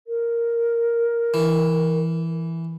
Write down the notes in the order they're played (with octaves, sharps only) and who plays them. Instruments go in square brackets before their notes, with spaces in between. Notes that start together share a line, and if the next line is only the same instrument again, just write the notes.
[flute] A#4
[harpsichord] E3